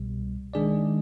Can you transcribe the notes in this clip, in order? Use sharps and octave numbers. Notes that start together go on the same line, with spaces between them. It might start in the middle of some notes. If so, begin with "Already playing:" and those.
Already playing: C2 B2 G3
D#3 G#3 D4 G#4 D5